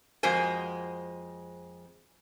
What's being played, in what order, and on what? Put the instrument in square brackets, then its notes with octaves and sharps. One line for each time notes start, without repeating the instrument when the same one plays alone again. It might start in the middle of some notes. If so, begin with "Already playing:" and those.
[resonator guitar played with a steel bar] F2 G#3 F#4 A#4 C5 G#5